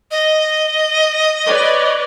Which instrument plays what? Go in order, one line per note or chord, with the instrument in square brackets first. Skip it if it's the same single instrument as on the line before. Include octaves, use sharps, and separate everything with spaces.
[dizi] D#5
[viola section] B4 C#5 D5